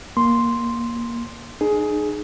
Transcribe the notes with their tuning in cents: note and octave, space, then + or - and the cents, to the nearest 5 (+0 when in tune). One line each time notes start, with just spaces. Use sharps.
A#3 +10 C6 +0
D#4 -40 G#4 +15